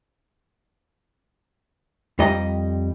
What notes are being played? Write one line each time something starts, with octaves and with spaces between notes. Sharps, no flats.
F2 G3 G4 D#5 A#5